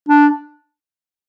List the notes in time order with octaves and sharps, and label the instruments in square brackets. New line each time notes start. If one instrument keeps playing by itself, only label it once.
[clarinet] D4